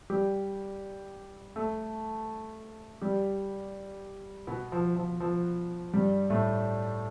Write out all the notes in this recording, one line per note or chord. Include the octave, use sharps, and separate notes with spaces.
G3 G4
A3 A4
G3 G4
B2 B3
F3
F3
F3
G2 G3
A2 A3